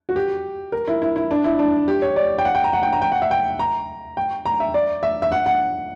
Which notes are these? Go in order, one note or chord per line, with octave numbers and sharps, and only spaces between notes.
F#4
G4
A#4
E4
E4
E4
D4
E4
D4
G4
C#5
D5
G5
F#5
G5
A#5
F#5
G5
A#5
G5
F#5
E5
G5
A#5
G5
A#5
E5
D5
E5
E5
F#5
F#5